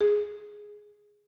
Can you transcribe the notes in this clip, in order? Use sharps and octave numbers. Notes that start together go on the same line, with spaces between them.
G#4